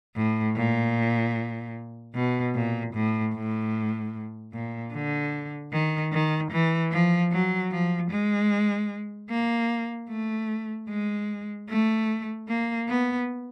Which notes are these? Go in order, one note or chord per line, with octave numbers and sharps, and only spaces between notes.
A2
A#2
B2
A#2
A2
A2
A#2
D3
D#3
D#3
E3
F3
F#3
F3
G#3
A#3
A3
G#3
A3
A#3
B3